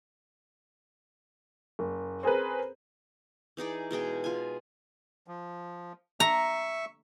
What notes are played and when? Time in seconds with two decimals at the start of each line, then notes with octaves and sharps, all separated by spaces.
1.79 F#1
2.23 C4 G#4 A#4 B4
3.57 E3 D#4 G#4 D5
3.91 B2 G#3 G#4 G5
4.24 F4 G#5
5.28 F3
6.20 E5 A#5 C#6